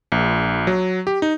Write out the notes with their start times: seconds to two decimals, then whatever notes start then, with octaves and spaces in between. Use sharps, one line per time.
0.12 A#1
0.67 F#3
1.07 G4
1.22 D#4